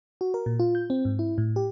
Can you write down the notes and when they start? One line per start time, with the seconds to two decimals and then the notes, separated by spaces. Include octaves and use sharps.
0.21 F#4
0.34 A#4
0.46 A#2
0.59 F4
0.75 G6
0.90 C4
1.05 G#2
1.19 E4
1.38 A2
1.56 G4